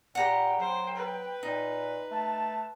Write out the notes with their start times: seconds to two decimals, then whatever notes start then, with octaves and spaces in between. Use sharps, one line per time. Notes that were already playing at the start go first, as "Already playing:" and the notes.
0.15 A#2 G4 F#5 G5 A#5 B5
0.59 F#3 C5
0.96 B4
1.43 A#2 D#4
2.11 A3 A5